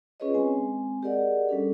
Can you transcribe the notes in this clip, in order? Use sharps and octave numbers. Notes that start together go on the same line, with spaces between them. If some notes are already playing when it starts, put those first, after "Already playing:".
C#4 F4 G#4 B4 C#5 D#5
G#3 C4 G#5
G4 G#4 A#4 D5 D#5 F#5
G3 C#4 D4 A4